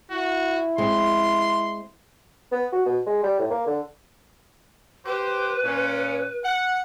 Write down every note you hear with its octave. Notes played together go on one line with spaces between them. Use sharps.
E4 F#4
G#3 C4 C6
B3
F#4
B2
G#3
G3
A2
A#3
D3
G4 B4 C5
A#2 C#4
F#5